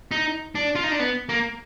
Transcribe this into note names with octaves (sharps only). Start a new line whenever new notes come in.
D#4
D4
F4
D#4
D4
B3
A#3